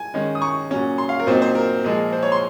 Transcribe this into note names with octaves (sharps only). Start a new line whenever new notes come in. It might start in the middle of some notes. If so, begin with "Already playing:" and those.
Already playing: G#5
D#3 G#3 C#4
D#6
C#6
A#2 F#3 C#4
C6
F5
A#4
A#2 F#3 C4 D#4 C5
C5
A#4
A#2 F3 G#3
C5
C#5
C6